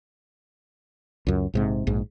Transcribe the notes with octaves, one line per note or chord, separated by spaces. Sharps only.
C#2 F#2
A#1 G#2 C3
A#1 G#2